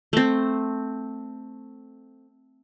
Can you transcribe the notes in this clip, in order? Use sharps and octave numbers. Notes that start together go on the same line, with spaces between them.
A3 C4